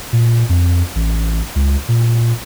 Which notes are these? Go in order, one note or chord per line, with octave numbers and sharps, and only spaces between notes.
A#2
F2
A1
C#2
A#2